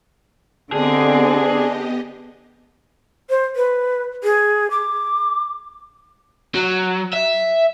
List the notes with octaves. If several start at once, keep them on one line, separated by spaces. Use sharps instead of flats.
D3 B3 C4 D4 G4 G#4 D#5
C5
B4
G#4
D6
F#3
E5